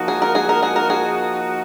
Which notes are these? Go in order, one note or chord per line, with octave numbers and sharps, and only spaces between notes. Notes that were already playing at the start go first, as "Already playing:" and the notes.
Already playing: F3 A#3 D#4 F#4
G#4
A#4
G#4
A#4
G#4
A#4
G#4